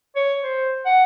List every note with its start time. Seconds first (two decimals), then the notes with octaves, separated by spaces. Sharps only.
0.16 C#5
0.43 C5
0.85 F#5